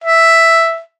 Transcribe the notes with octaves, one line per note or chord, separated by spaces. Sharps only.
E5